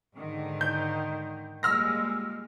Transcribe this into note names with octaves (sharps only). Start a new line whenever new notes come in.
G#2 D3 D#3
G6
A#2 G3 G#3 E6 F6 A#6